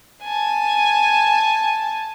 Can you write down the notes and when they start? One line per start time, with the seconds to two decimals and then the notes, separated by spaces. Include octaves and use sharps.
0.23 G#5 A5